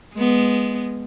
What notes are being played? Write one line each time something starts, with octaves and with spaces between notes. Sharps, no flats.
G#3 B3